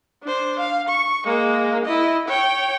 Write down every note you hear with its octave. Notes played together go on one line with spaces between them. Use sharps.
D4 C5
F5
C#6
G#3 A#3
E4 D#5
C#5 G5